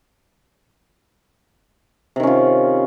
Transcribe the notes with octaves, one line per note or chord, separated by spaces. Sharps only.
C3 D#3 C#4 F4